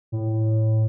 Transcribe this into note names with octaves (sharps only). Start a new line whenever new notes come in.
A2